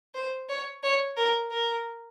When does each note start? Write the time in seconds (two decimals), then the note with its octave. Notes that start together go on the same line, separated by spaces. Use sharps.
0.14 C5
0.49 C#5
0.83 C#5
1.17 A#4
1.51 A#4